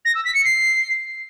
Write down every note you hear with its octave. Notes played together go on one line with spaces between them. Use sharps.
A#6
E6
B6
C#7
C7